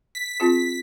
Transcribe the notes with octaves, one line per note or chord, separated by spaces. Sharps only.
B6
C4 F4 G#4